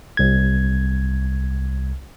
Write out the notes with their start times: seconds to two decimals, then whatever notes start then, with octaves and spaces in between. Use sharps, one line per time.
0.17 C2 G#6